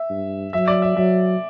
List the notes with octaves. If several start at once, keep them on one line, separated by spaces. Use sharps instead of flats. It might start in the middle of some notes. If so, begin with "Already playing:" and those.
Already playing: E5
G2
F#3 E5
D5
E5
F#3 E5